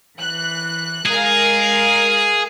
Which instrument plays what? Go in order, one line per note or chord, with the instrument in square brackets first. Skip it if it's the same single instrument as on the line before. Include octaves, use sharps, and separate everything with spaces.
[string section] E3 F#6
[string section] G#3 A#4 F5 [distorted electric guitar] G#4